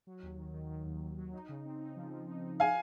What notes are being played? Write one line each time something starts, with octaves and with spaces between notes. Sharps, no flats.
F#3
D#2
D#3
D#3
D#3
D#2
D#2
F#3
D#4
C#3
C4
D#4
F3
F3
D#4
D#4
F3 F5 G#5